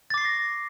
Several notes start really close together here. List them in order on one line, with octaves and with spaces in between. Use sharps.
A6 D6 C7 C#6 A#6